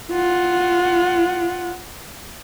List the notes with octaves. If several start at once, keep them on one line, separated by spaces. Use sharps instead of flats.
F4 F#5